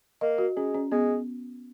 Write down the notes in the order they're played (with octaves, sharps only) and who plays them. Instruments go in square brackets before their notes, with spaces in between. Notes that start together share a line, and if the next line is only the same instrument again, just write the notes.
[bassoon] A#3 [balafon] D#5
[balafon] F#4
[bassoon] G#3 [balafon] C#4
[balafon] C#4
[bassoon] G#3 [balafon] B3